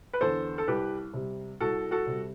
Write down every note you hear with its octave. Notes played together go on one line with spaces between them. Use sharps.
B4
E2 D3 A4 C5
A4
C2 G4 B4
C3 G3
C2 F#4 A4
F#4 A4
C3 G3